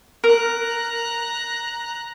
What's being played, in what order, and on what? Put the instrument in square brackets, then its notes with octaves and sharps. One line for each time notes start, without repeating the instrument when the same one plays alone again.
[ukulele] A#4 [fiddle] A#5 F#6